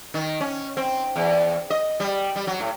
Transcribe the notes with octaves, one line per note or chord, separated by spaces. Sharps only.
D#3
C#4
C4
E2
D#5
G3
G3
F#3
A2